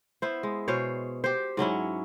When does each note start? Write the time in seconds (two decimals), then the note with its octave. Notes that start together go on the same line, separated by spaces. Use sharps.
0.22 B3 E4 C5
0.43 G#3
0.68 B2 G#4 C5 C#5
1.24 G4 C5
1.57 G#2 F#3 C#4 E4